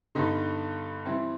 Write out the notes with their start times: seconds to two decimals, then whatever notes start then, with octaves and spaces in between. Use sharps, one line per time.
0.15 G2 D3 G3 B3 D#4
1.05 E3 G3 C4 E4